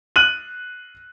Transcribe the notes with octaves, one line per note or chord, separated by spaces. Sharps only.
F#6 D#7 F#7